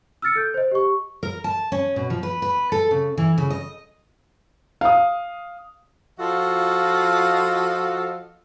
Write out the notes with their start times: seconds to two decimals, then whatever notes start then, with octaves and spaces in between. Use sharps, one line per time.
0.22 E6 F6 A6 C#7
0.36 A4 G6
0.54 C5 D#5
0.72 G4 C#6
1.23 A#4
1.44 A5
1.72 C#4
1.96 B2
2.10 F3
2.23 B4
2.42 B4
2.72 A4
2.91 C#3
3.18 E3
3.38 C#3
3.50 D#5
4.81 F5 D#6
6.19 F3 F4 F#4 A4 D#5 F5